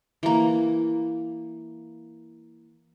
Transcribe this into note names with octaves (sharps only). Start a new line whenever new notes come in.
E3 A#3